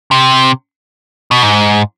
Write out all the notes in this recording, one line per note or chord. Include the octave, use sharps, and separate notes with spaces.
C3
B2
G#2